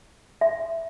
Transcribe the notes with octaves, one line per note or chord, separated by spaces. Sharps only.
E5